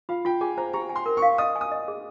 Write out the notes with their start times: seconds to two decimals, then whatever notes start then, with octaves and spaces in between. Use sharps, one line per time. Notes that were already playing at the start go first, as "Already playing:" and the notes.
0.09 F4 F5
0.25 F4 G5
0.41 G#4 G#5
0.57 C5 A#5
0.73 G4 A#5
0.89 G#5
0.96 C6
1.06 A#4
1.17 C#6
1.22 F5
1.38 D#5 D#6
1.56 G#5
1.61 D#6
1.72 D#5
1.88 G#4